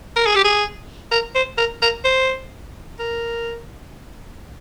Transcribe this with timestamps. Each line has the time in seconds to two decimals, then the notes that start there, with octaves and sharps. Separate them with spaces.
0.16 A#4
0.26 G#4
0.35 G4
0.45 G#4
1.11 A#4
1.35 C5
1.57 A#4
1.82 A#4
2.05 C5
2.99 A#4